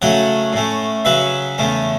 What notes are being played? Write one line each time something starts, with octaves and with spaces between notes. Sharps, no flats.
C#3 F#3 A3 C#4 C#5 F#5
A2 A3 C#4
C#3 F#3 C#4 B4 E5
E2 C#3 A3 C#4